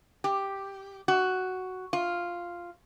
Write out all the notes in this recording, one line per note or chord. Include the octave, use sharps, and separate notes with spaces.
G4
F#4
F4